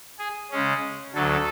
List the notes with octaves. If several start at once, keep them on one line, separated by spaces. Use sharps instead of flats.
G#4
C#3 G#3 C#4
D2 D3 F#3 A4